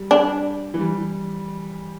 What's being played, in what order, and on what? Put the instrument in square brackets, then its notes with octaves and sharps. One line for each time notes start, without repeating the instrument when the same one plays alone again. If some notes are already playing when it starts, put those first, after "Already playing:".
Already playing: [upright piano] G3
[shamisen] D4
[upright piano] E3
G3